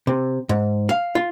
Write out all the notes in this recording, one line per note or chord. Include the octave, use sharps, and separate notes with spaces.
C3
G#2
F5
F4